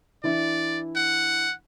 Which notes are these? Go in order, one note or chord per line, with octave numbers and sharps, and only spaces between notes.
E3 D4 E4 D5
F#5